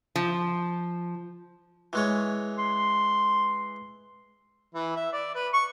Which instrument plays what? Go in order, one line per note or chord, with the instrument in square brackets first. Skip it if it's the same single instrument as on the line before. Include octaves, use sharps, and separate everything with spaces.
[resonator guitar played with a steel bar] F3
[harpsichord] E3 G#3 C#5
[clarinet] C6
[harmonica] E3
E5
D5
B4
C#6